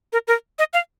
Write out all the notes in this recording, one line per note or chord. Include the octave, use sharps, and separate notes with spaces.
A#4
A#4
D#5
F5